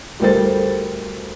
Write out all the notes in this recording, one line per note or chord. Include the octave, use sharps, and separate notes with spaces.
D2 G3 A4 A#4 C5 A6